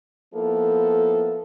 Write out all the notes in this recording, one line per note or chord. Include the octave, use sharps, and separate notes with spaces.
F3 A#3 B3 E4 A4